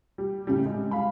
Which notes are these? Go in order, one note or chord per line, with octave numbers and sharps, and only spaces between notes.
G3
A2 C#3 G3
G#3
F5 B5